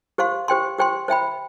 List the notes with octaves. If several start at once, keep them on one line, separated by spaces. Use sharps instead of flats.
G4 C5 F5 C6
G4 C5 G5 C6
G4 C5 G5 C6
C5 E5 G5 B5